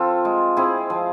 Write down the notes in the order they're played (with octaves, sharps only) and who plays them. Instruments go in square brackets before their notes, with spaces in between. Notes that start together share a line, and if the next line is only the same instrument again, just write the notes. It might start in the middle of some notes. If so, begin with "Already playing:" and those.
Already playing: [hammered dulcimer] F3 C4 F4 A4
G#3
C4 E4 G#4
F3